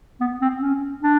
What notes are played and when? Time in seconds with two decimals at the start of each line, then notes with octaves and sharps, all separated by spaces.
0.21 B3
0.42 C4
0.61 C#4
1.03 D4